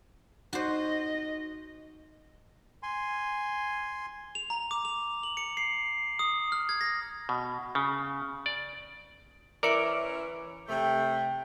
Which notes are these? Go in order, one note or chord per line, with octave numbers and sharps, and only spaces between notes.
D#4 F#4 C5 D#5
G#5 C6
F7
A#5
D6
F7
F#7
C#7
C7
D#6
F6
G#6
A#6
B2
C#3
D5
E3 C#4 A#4 D5 E5 D6 C#7 D7
C3 A3 G5